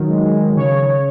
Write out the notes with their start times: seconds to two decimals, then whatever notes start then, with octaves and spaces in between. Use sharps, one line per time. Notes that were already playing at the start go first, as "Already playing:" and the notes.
Already playing: D#3 F#3
0.09 G#3
0.25 G#3
0.41 D#3
0.56 C#3 C#5
0.72 C#3
0.88 C#3